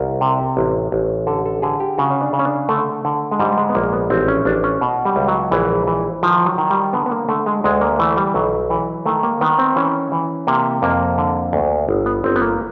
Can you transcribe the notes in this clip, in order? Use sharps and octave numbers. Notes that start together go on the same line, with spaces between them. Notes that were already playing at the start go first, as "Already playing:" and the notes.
Already playing: C2 A#4
C3
A1
A1
D3 A4
A4
D3 G#4
G4
C#3 F#4
C#4
D4
C#3
C#4
D4
D3 A3
D3
G#3
G#2 G3
G#3
B3
A#1 A#3
B3
A1 C4
C#4
A1 D4
C#4
B2
G3
C#2
F#3
A#1 E3
E3
D#3 F3
F#3
D#3
G3
D3 B3
B3
A#3
D3 A3
G#3
D2 G#3
A#3
E3 A3
G3
B1 F#3
E3
D#3 A3
A#3
D#3 B3
C4
E3 C#4
E3
C3 A#3
F2 A#3
D3
D2
G1
B3
G1 C4
B3
A#3